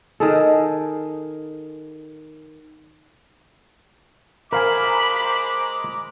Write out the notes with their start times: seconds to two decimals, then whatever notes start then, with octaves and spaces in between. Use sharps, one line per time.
0.20 D#3 G#4 A4
4.52 G#3 A#4 C5 F5 G#5 A#5 B5 D6